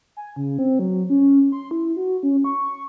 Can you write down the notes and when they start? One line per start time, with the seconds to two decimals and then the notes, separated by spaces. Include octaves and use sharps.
0.17 G#5
0.36 C#3
0.59 C4
0.79 F#3
1.10 C#4
1.52 C6
1.71 E4
1.96 F#4
2.23 C#4
2.44 C#6